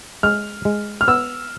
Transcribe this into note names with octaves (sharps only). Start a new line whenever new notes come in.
G#3 F6
G#3
F6
B3 E6